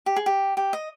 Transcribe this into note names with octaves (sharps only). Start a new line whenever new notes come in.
G4
G#4
G4
G4
D#5